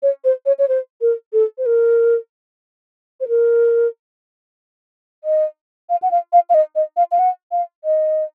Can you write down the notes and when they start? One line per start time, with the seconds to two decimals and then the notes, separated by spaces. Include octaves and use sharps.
0.03 C#5
0.25 C5
0.46 C#5
0.59 C#5
0.68 C5
1.01 A#4
1.33 A4
1.58 C5
1.66 A#4
3.21 C5
3.28 A#4
5.24 D#5
5.90 F5
6.02 F#5
6.11 F5
6.33 F5
6.50 F5
6.54 D#5
6.76 D#5
6.97 F5
7.12 F5
7.19 F#5
7.52 F5
7.84 D#5